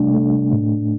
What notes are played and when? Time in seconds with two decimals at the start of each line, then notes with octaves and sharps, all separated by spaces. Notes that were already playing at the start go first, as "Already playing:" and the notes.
Already playing: C3 G3 A3 D4
0.14 A3
0.53 A2